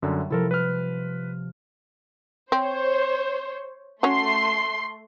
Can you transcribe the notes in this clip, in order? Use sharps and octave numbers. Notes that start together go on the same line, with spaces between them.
F#2 D3 G3 A3
C3 F3 E4 A4 A#4
B4 F6
C4 C5 C#5
A3 C#4 F#4 C6 C7